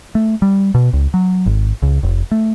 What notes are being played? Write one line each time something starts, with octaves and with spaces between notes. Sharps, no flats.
A3
G3
B2
C#2
F#3
G#1
C#2
F1
A3